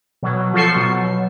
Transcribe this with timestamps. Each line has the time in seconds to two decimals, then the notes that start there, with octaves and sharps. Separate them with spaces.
0.23 B2 F#3
0.53 F3 F4 A4 C#6 C7
0.75 B2 F#3